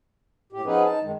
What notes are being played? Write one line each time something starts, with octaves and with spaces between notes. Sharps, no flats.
A2 G4
F3 B3 C#4 D#4 G#4 B4
D#4 A5
F#2 D#3 G#3